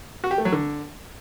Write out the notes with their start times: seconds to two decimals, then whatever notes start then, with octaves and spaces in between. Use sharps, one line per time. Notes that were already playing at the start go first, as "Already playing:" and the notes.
0.24 F#4
0.31 G4
0.38 A3
0.45 F#3
0.52 D3